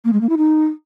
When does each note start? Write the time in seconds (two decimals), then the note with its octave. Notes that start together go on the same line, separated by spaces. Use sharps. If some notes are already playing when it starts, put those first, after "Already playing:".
0.05 A#3
0.13 G#3
0.21 A#3
0.29 E4
0.37 D#4